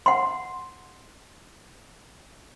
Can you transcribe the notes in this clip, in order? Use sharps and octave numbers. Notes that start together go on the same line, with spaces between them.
F#5 C6